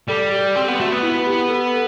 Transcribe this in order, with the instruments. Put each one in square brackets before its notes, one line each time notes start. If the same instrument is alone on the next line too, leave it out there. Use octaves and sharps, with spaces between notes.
[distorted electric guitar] G3 [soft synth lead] A4
[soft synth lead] G4
[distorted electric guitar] C4 [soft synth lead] G4
[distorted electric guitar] B3
[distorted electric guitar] A3 [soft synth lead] F#4
[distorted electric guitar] B3
[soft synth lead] E4
G4
A4